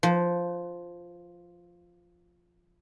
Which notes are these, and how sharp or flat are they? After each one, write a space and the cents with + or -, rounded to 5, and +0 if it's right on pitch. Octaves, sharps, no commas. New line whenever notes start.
F3 +0 B4 +30